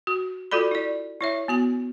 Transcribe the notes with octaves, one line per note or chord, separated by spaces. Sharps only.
F#4
F4 F#4 A4 D5 B5
E4 D5
E4 C#5 E5
B3 F#4 G#5